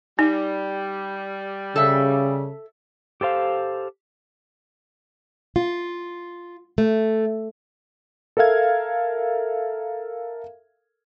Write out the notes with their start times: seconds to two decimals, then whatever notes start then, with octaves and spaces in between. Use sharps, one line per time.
0.19 G3 D#4
1.76 C#3 A4 E5
3.21 G4 A4 C5 F5
5.56 F4
6.78 A3
8.37 A4 A#4 E5 F5 G#6